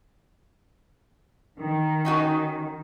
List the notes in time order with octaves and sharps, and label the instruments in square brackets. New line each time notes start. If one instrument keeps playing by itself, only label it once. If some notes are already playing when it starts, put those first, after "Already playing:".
[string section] D#3
[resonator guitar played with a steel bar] C#4 D#4 F#4